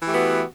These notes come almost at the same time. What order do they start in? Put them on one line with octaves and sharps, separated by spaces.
E3 G4 A3 F#4 B3